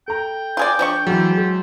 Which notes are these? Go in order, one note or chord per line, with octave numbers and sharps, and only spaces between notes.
A4 G5 A#5
F4 G#4 D5
F3 D4 C#6
E3 F#3 G#3
G#3